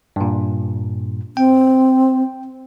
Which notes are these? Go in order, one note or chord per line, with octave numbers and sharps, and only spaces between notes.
G2 A#2
C4 G5